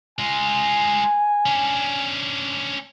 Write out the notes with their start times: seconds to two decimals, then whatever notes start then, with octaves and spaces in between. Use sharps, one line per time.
0.19 G#3 F4 G#5
1.46 C#4 D4